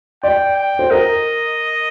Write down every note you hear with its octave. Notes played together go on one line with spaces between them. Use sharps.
D5 G5
G5
C5
A#4 D#5